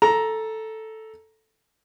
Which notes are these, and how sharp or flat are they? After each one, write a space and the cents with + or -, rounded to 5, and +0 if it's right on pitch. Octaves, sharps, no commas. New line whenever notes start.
A4 +0 A#5 +10